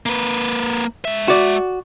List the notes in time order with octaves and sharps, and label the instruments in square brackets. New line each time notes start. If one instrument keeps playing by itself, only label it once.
[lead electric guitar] A#3 B4
G#3 E5
[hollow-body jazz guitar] F#4 D5